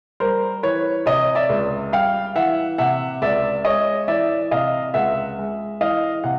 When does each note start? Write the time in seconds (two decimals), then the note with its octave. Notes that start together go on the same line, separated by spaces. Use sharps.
0.20 G3 A#4 C5
0.63 E3 B4 C#5
1.06 C3 C#5 D#5
1.35 D5 E5
1.49 C#2
1.92 G3 F5 G5
2.36 E3 E5 F#5
2.78 C3 E5 F#5
3.22 C#2 D5 E5
3.65 G#3 C#5 D#5
4.08 E3 D5 E5
4.51 C3 D#5 F5
4.94 C#2 E5 F#5
5.38 G#3
5.81 E3 D#5 F5
6.24 C3 F#5